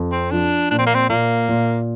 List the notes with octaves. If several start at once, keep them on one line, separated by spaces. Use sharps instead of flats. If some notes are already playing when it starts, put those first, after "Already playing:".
Already playing: F2
C4
F3 D4
A#2 D4
C4
A#3
C4
A#2 A#3
A#2